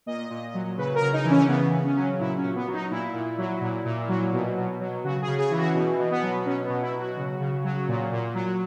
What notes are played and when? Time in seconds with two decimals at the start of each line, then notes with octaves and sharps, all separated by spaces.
0.06 A#2 D#5
0.30 A#2
0.54 F#3
0.77 C#3 B4
0.95 A#4
1.01 C#3
1.13 D#4
1.24 E3
1.30 C#4
1.48 C#3 B3
1.73 C#3
1.84 C#4
1.96 F#3
2.19 A#2 E4
2.37 C#4
2.43 A#2
2.55 B3
2.67 F#3
2.73 D#4
2.91 A#2 E4
3.13 A#2
3.38 F#3
3.61 A#2
3.85 A#2
4.08 F#3
4.32 B2
4.56 B2
4.80 F#3
5.04 C#3 F#4
5.22 G#4
5.27 C#3
5.38 G#4
5.51 E3
5.57 F#4
5.74 B2
5.98 B2
6.10 B3
6.22 F#3
6.45 B2 C#4
6.63 B3
6.69 B2
6.81 E4
6.93 F#3
6.99 F#4
7.17 C#3
7.40 C#3
7.64 F#3
7.88 A#2
8.12 A#2
8.34 F#3